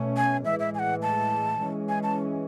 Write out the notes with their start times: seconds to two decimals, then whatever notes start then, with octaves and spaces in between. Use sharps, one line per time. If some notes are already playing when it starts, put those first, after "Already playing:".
Already playing: B2 A3 C#4
0.17 G#5
0.45 A2 E3 G#3 E5
0.60 E5
0.75 G#5
0.79 F#5
1.02 A5
1.61 E3 G#3 C#4
1.89 G#5
2.03 A5